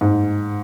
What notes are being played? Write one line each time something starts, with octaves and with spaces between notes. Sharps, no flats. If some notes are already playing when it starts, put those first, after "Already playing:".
G#2